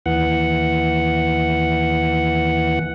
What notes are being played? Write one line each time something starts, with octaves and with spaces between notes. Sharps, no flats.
D#2 E3 F#5